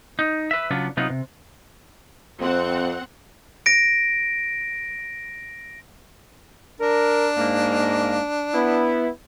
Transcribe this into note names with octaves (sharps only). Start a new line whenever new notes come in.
D#4
B4 E5
C#3 F#3 B3 D4 F4
C3 F#3 B3 D#4 F4
C3
F2 C4 F#5
A#6 D7
D4 A#4
G#2 A#3
B3 E4